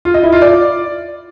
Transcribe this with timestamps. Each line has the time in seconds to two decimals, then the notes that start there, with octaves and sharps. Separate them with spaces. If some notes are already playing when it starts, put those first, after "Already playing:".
0.05 F4
0.14 D#5
0.23 E4
0.32 F4
0.41 D5